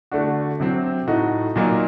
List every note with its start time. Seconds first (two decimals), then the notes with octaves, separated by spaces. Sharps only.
0.11 D3 A3 D4 F#4
0.60 C3 F#3 C4
1.07 A2 A3 D#4 F#4
1.56 A#2 F#3 A#3 D#4